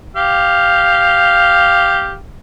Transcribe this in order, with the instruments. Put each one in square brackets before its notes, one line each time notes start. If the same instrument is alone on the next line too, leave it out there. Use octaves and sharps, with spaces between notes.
[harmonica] G4 F5